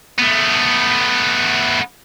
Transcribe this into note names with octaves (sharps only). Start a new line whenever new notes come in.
A3 B3